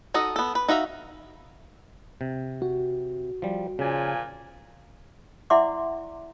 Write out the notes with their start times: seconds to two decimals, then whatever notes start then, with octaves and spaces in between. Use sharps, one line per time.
0.14 D#4 F#4 A4 D#5
0.36 B3 A4
0.55 B4
0.68 D#4 F#4 E5 F5
2.21 C3
2.62 F#4
3.42 F3 G3
3.79 A#2 C#3 F3 G#5
5.50 E4 D5 E5 F#5 C6 D6